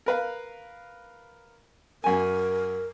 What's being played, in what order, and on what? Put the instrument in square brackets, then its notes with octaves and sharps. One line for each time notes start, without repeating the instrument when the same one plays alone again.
[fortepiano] A#4 B4 F5
[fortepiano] F#2 G#5 [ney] A#4